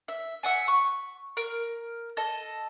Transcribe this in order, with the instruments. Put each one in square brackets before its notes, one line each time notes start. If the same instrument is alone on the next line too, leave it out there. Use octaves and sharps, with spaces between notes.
[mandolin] E5
E5 F#5 G#5
C#6
A#4
A4 D#5